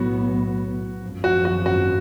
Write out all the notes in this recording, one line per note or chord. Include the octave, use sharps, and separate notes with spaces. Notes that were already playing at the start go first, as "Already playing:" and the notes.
Already playing: B1 A2 F#3 B3 F#4
G#1 F#2 F3
F#4
F#4
F#4